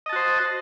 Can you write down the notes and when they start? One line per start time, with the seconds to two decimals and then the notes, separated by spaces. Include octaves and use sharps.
0.06 D#5
0.09 A5
0.13 F#4
0.16 C5